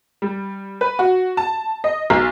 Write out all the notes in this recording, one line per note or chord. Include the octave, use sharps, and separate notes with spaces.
G3
B4
F#4
A5
D#5
B1